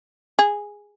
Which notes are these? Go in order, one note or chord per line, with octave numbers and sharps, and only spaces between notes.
G#4